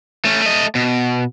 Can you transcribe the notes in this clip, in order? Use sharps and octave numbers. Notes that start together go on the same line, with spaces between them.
A3 C#4
A3 D#5
B2